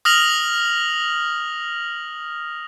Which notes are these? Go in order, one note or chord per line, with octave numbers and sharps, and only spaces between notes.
D#6 F6 A#6 F7 F#7